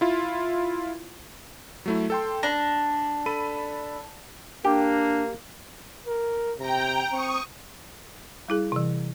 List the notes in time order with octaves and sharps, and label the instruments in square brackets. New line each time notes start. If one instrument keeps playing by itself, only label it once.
[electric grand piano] E4 F4
F#3 A3 E4
A4 G5 C6
[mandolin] D4 [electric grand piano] A#6
[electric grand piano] A4 B5 D#7
[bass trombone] A#3 [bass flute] D4 [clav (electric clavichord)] G4
[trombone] A#4
[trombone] C3 [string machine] G5 A#5
[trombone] C4 [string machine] C#6 D#6
[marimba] G3 E4 G#4
C3 E3